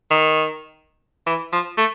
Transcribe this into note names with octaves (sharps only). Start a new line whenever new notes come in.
D#3
E3
F3
A3